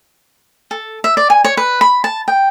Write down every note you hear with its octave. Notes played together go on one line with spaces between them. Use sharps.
A4
E5
D5
G#5
C#5
B4
B5
A5
G5